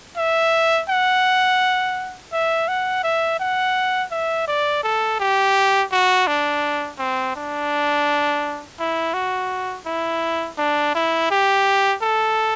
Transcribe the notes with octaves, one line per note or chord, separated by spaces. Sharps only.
E5
F#5
E5
F#5
E5
F#5
E5
D5
A4
G4
F#4
D4
C4
D4
E4
F#4
E4
D4
E4
G4
A4